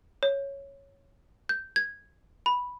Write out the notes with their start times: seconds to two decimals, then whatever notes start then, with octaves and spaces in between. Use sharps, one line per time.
0.23 C#5
1.49 G6
1.76 G#6
2.46 B5